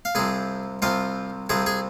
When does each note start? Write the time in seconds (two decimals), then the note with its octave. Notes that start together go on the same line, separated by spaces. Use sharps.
0.05 F5
0.15 C2 C3 F3 G#4 G#5
0.82 C2 C3 F3 F4 F5
1.49 C2 C3 F3 G#4 G#5
1.66 G#4 G#5